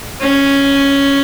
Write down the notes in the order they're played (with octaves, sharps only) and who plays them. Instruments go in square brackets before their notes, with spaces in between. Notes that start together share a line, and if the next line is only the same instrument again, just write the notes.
[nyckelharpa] C#4